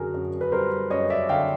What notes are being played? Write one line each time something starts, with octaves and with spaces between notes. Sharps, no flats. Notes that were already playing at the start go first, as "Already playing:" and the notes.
Already playing: F#2 D3 F#4 G#4 A#4
F#2
B4
G3 A#4 C5
F#2 C#5 D#5
D5 E5
D3 F5 G5